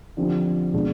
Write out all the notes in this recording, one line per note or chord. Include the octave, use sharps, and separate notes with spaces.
D3 F3 C4 G4
B2 G#3 D4